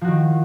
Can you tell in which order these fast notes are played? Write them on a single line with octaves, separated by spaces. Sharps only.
F3 F#4 D#3